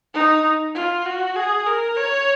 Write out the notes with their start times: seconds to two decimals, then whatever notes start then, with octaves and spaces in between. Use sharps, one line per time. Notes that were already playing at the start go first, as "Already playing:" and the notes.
0.14 D#4
0.75 F4
1.06 F#4
1.36 G#4
1.66 A#4
1.97 C#5